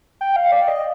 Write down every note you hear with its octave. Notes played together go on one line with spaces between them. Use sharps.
G5
F5
D5
D#5